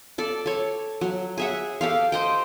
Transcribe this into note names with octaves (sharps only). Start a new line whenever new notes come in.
A4 D5
A4 C#5
F#3
G#4 E5 F#5
G4 A4 F5
C5 D#5 G5